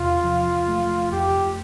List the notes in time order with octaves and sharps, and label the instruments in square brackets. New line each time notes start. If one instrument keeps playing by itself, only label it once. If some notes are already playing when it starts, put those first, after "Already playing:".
Already playing: [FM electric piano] E2 C3 [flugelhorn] F4
[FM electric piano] F3
A3
[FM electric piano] F2 [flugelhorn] G4